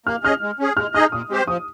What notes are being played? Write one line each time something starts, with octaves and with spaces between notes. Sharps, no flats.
A#3 F6
C#4 G#4 D#5 F6
G#3
C#4 G#4
G#3 F6
D#4 G#4 D#5 F6
A#2 D#6
G#3 C4 G4 C5
F3 D#6